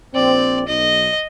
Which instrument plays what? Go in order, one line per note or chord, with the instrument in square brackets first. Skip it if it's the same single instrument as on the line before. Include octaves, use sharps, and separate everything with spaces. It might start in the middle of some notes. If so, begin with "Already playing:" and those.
[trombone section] A#1 C4 [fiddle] D5
[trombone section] B1 [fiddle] D#5